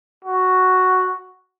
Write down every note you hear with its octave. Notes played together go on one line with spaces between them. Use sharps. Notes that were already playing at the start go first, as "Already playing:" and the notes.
F#4